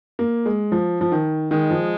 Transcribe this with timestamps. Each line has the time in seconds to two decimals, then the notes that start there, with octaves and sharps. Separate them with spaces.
0.19 A#3
0.46 G#3
0.72 F3
1.01 F3
1.12 D#3
1.51 D#3 G#3
1.71 F3